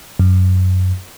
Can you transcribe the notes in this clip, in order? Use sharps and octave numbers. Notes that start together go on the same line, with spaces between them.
F#2